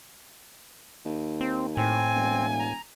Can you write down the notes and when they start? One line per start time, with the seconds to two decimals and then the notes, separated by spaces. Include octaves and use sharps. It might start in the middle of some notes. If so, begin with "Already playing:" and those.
1.05 D#2
1.41 C4
1.77 A2 C4 G#5
2.15 E1
2.60 A#5